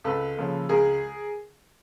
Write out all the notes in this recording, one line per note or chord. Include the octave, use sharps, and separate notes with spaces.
C#2 A4 B4
C#3 F3 A#3
C#2 G#4 A#4